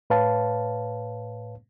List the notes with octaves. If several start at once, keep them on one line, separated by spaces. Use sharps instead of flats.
A2 B4 C#5 F5 A5